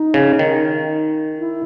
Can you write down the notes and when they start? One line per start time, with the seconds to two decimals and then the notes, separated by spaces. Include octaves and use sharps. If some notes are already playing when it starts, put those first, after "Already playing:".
Already playing: D#4
0.14 C#3
0.39 D#3
1.39 E4